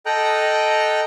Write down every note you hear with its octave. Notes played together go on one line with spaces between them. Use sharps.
A4 D#5 G5 A#5 F#6